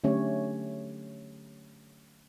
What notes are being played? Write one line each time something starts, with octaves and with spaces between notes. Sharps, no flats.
D3 F#3 A3 C#4 G4 C#5